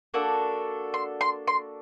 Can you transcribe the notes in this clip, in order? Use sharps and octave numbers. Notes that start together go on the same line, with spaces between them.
A#3 D4 F#4 A4
C6
C6
C6